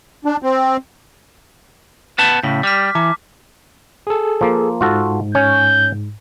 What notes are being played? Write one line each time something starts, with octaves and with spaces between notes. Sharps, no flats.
D4
C4
B3 B4 A5 G6 A6
A2 C#3 B6
G3 D6 F6 B6
E3 A5 A#5 D6
G#4 A4
F3 A#3
G#2 F4 F#4 A4
C#4 C#5 G6